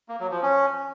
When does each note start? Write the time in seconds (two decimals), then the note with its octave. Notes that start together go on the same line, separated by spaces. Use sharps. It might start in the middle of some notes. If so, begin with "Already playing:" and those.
0.09 A#3
0.20 F#3
0.31 F3
0.42 C#4